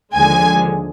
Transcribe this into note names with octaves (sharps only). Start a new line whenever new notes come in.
D#2 D3 F3 G#3 G#5